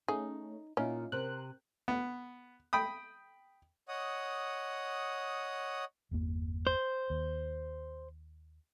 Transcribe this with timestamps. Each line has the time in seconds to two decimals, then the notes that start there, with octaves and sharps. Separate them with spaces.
0.08 A3 C#4 D#4 G#4
0.77 A#2 C#4 D#4 E4 F5
1.12 C3 A#4 C5 F#6
1.88 B3
2.73 G5 B5 D#6
3.89 C#5 D#5 F#5 D#6
6.11 G1 E2 A#3
6.67 C5
7.10 D#2